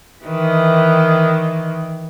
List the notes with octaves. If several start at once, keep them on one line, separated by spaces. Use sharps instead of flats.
D#3 E3